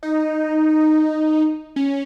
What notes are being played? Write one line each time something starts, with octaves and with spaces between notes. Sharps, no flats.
D#4
C#4